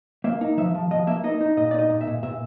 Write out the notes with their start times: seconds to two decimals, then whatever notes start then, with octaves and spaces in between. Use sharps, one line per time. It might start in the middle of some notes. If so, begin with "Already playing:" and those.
0.24 A#3 E5
0.41 D#4
0.57 F3 E5
0.75 F3
0.91 F3 D#5
1.07 A#3 E5
1.24 D#4 D#5
1.41 D#4
1.57 A#2 D#5
1.71 D5
1.74 D#4 D#5
1.89 A#2
2.01 E5
2.07 A#2
2.23 A#2 E5